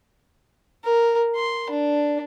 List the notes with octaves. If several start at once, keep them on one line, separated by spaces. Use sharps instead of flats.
A#4
C6
D4